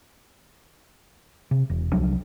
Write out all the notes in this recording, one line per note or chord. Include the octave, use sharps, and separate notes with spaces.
C3
E1
C2 F3 F#3 D4